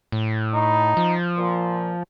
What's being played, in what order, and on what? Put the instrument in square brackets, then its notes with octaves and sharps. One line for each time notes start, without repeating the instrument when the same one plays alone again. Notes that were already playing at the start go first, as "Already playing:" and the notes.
[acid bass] A2
[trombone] D#4
[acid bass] F3
[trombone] A#2